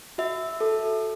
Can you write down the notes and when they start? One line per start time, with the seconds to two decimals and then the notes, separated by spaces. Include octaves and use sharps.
0.18 F#4 E5
0.61 A4